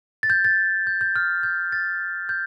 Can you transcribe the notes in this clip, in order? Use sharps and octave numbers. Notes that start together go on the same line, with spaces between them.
A6
G6
A6
G6
G6
F6
G6
A6
G6